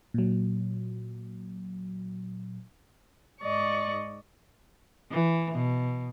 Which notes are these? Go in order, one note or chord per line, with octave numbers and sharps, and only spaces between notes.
A#2 F#3
G#2 D5 D#5 C#6
E3
B2